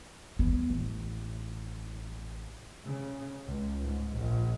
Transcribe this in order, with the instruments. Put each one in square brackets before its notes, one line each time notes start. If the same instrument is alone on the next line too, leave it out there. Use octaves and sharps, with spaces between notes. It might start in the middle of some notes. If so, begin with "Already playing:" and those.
[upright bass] B3
A1
[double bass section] C#3
C#2
G#2
A#1